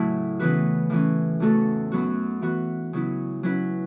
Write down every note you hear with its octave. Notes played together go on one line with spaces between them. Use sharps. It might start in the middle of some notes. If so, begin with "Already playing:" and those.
Already playing: A2 C#3 F#3 A3 E4
C#3 E3 B3 F#4 B4
A2 E3 C#4
E2 C#3 A3 F#4 A4
F#2 F#3 B3 F#4
E3 B3 F#4
C#3 F#3 B3 E4
F#3 C#4 E4 B4